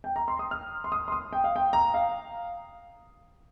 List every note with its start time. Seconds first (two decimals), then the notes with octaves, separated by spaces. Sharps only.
0.04 G5
0.16 A#5
0.28 C6
0.39 D#6
0.51 F6
0.84 C6
0.92 D#6
1.08 C6
1.12 D#6
1.33 G5
1.44 F5
1.56 G5
1.73 A#5
1.94 F5